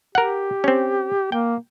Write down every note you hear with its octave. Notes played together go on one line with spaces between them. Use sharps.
G4 A#4 F#5
C4 C#4
A#3 G5